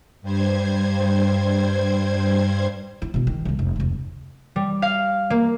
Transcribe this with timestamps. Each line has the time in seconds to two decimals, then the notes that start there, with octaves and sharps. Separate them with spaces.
0.22 G2 G3 C5 G#6
3.02 E4
3.14 B2 E4
3.27 D#3
3.45 C2 G3
3.59 F1
3.76 F1 D2
4.56 G3
4.82 F5
5.30 A#3